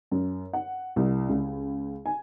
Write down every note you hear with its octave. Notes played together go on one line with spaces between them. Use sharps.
F#2
F#5
C2
C#2
G#5